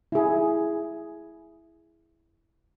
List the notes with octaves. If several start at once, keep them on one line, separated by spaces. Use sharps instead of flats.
E4 G#4